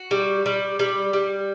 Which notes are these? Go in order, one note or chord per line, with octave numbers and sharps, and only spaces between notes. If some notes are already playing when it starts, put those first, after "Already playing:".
Already playing: F#4
G3
G3
G3
G3